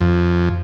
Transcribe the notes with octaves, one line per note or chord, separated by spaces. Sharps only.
F2